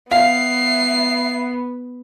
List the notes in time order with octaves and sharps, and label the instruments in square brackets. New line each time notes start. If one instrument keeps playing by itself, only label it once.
[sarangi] B3 [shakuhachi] E5 [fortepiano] F5 [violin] C7